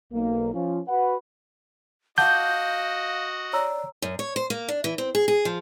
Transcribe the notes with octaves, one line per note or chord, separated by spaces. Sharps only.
B1 A#3
F3 C#4 F4
F#4 B4 F#5
F#4 D#5 F5 F#5 A5 D6 G6
C#5 D5 A#5 E6
F#2
C#5
C5
A#3
D4
E3
C4
G#4
G#4
F3